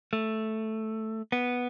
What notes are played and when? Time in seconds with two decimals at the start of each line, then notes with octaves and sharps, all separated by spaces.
0.13 A3
1.32 B3